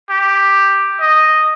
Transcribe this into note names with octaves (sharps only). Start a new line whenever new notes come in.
G4
D#5